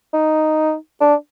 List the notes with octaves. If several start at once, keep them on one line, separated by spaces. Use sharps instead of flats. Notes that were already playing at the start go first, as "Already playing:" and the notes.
D#4
D4